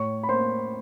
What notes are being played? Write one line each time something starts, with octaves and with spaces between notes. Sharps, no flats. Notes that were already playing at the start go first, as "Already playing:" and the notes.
Already playing: A2 C#5 C#6
B5
A#3 C5 C6